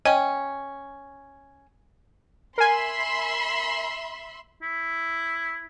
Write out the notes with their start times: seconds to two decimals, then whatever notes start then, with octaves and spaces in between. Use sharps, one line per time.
0.06 C#4 D#5 G5
2.58 A#4 E5 G#5 B5 C6
4.62 E4